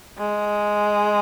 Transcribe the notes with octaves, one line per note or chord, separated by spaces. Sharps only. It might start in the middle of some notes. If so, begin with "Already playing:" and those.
G#3